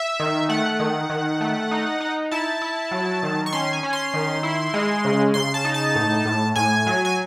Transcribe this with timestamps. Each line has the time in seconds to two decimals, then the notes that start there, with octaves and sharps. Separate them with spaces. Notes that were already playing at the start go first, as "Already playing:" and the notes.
Already playing: E5
0.20 D#3
0.49 A3 F#5
0.80 D#3
1.10 D#3
1.41 A3
1.71 D#4
2.00 D#4
2.31 E4 A5
2.62 E4
2.91 F#3
3.23 D#3
3.46 C#6
3.53 C#4 C6
3.73 G#5
3.83 C#4
3.93 C6
4.14 D#3
4.43 E4
4.74 G#3
5.05 C#3
5.34 C#3 C6
5.54 A5
5.65 D#4
5.74 A5
5.96 A2
6.25 A2
6.56 A2 G#5
6.87 F#3
7.05 G#5